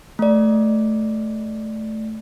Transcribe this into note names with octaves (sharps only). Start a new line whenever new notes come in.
A3 D5